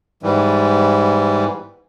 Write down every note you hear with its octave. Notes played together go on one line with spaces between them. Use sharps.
G#2 E3 G3